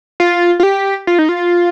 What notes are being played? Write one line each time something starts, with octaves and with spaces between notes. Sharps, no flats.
F4
F4
G4
F4
D#4
F4